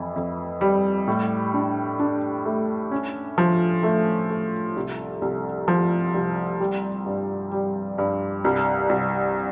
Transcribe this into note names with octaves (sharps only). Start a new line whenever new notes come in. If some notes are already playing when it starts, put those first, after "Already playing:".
Already playing: F2 E3
F2
G3
A2
D4
D4
A3
C#4
F3
A3
A3
C2
C2
F3
C2
G3
G2
G3
G2
C2
C2